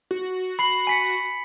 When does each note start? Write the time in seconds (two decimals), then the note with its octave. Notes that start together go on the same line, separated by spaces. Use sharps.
0.11 F#4
0.59 B5 C7 F#7
0.87 G#5 B6 C#7